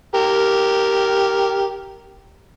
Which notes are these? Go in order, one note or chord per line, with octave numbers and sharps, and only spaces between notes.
G4 A#4